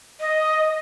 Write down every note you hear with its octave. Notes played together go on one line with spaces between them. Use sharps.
D#5